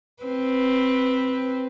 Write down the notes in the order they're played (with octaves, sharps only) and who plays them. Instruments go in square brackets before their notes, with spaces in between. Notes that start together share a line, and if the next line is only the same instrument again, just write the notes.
[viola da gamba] C4 B4